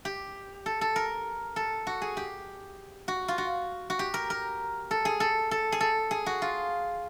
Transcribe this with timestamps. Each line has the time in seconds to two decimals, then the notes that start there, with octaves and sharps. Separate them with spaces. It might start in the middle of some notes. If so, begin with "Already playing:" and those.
0.05 G4
0.66 A4
0.81 A4
0.96 A#4
1.56 A4
1.87 F#4
2.02 G#4
2.17 G4
3.08 F#4
3.28 F4
3.38 F#4
3.90 F#4
3.99 G4
4.14 A#4
4.30 A#4
4.91 A4
5.05 G#4
5.20 A4
5.51 A4
5.72 G#4
5.80 A4
6.11 G#4
6.26 F#4
6.42 F4